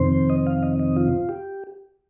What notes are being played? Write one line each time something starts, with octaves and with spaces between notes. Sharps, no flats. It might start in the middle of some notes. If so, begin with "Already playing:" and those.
Already playing: F2 C3 D#3 C4 C5
D#5
F5
D#5
D#5
F4
G4